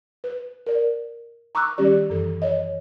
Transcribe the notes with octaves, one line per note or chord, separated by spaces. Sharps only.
B4
A#4 D5
A#5 C#6 D6 E6 F#6
D#3 G3 C#4 G4 D5
F#2 E3 A4
C#5 D#5